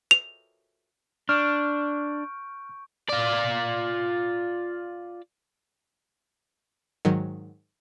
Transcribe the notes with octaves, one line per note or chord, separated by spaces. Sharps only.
F7
D4 C#6 F6 G6 D7
F4 D5
G#2 D#3 F#3